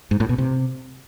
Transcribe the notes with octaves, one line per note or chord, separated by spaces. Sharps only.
G#2
A2
B2
C3